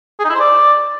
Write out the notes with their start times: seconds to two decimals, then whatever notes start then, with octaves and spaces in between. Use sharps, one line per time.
0.19 G#4
0.25 D#4
0.30 E4
0.35 C5
0.40 D5